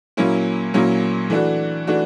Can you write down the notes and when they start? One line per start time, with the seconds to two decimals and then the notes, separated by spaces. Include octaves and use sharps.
0.17 A#2 F#3 A#3 C#4 E4
0.74 A#2 F#3 A#3 C#4 E4
1.30 E3 A3 D4 F#4
1.87 E3 A3 D4 F#4